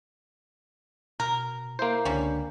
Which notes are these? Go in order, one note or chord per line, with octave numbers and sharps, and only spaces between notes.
B2 A#4
A#3 E4 C5 E5
C#2 D3 G3 C#4 D4